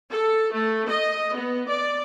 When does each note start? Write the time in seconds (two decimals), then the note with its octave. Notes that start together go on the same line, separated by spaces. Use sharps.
0.11 A4
0.53 A3
0.89 D#5
1.34 B3
1.68 D5